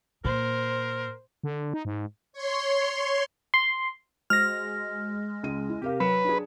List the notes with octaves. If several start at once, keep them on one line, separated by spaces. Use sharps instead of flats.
A#2 A#4 C5
D3
D#4
G#2
C#5 C6
C6
G#3 F#4 C5 F6 A#6
C#2 D#7
E4
C3 G4 A#4 F5
F#3 B4 C#7 E7
D4 G#4